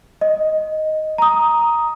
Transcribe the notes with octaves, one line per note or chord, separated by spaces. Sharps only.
D#5
A#5 D#6